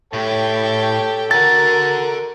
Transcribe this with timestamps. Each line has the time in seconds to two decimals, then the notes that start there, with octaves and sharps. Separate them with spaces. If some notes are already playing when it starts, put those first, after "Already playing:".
0.13 A2 G4 A4 C#5 G5 A5
1.31 F#4 A4 A#4 F#5 A6